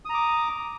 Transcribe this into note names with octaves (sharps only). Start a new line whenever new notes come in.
A#5 D6 D#6